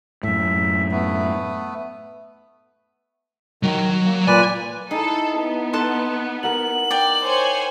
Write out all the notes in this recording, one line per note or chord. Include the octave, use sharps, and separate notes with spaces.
F#2 A2 E5
A3 B3
D#3 F#3
A#3
A#2 B4 D5 G#5
D#4 E4 G#4 A4
B3
D#4 A4 A5 C6 F#6
A#4 F#5 F#7
D5 G5
C5 C#5 G#5